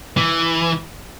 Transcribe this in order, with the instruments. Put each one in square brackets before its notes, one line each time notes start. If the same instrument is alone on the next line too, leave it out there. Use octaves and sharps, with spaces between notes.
[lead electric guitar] E3